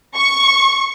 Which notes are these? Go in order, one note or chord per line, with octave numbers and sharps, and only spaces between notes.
C#6